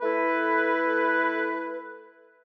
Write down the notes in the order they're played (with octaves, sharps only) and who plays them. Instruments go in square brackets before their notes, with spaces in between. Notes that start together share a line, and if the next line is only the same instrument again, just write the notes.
[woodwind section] A3 E4 A4 B4